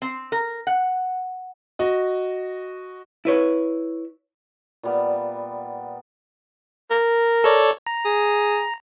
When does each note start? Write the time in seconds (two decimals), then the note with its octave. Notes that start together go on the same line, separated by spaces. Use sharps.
0.02 C4
0.32 A#4
0.67 F#5
1.79 F#4 D#5
3.25 E4 B4 C#5
4.83 A#2 G3 B3
6.91 A#4
7.44 A4 C#5 D5
7.86 A#5
8.05 G#4